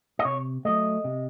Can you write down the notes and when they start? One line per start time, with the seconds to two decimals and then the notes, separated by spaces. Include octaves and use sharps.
0.19 D#5
0.25 C3 C#5
0.65 F#3 A3 D#5
1.04 C3